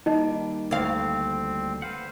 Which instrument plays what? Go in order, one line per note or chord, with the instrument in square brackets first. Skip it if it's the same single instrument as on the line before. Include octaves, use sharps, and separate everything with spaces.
[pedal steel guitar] D#3 G3 A#3 [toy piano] D#4 D#5
[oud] D2 F5 [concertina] C4
[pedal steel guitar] B4 F#5 [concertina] C5 F5